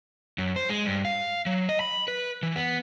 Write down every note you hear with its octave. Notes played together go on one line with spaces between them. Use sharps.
F#2
C5
G#3
G2
F5
F#3
D#5
B5
B4
E3
B3